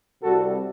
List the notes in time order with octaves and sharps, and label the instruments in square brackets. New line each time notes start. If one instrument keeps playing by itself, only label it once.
[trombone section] C2 C3 G3 F#4 A4